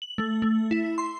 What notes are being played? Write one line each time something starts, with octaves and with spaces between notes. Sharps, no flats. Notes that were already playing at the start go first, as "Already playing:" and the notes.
F#7
A3
A3
E4
C6